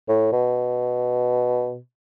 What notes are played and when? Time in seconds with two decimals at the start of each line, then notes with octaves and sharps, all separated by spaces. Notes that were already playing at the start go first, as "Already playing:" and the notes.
0.08 A2
0.32 B2